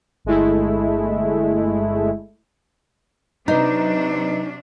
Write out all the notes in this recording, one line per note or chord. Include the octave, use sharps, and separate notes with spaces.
G1 G#3 A3 E4
C3 F#3 D4 D#4 B4 D#5 A#5